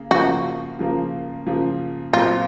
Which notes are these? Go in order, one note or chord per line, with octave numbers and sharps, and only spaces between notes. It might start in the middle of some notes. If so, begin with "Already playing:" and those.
Already playing: C#3 A#3
C#3 F3 A#3 F#4
C#3 F3 A#3
C#3 F3 A#3
A#2 F#3 C4 F4